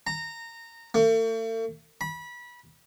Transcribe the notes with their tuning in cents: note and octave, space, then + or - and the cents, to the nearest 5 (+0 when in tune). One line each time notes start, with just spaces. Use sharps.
A#5 -20
A3 +45
B5 -25